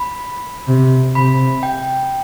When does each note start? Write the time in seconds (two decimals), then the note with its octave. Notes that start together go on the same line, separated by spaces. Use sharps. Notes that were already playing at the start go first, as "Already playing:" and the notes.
Already playing: B5
0.67 C3
1.15 C3 B5
1.63 G5